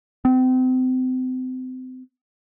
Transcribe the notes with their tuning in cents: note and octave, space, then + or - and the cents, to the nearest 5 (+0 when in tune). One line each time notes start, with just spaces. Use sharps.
C4 -35